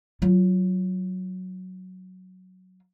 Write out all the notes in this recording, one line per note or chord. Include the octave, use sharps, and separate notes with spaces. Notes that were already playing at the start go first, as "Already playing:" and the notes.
F#3 F4